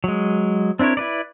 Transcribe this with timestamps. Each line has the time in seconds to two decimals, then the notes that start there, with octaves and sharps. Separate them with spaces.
0.04 F#3 G#3
0.79 C4 D4 E4 A#4 C#5
0.97 E4 B4 D5